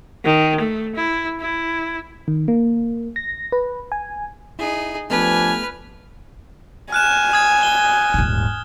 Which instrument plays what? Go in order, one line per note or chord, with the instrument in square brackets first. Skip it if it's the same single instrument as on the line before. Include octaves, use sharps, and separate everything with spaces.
[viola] D#3
A3
E4
E4
[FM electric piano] D#3
A#3
A#6
B4
G#5
[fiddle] D#4 G#4 [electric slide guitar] E4
[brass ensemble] F3 D4 G#5 [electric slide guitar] A3 B3 G4 [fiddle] B4 F6
[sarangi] G#5 [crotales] F6 F#6 E7
[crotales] D#6 G#6
G7
[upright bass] D#1 G#2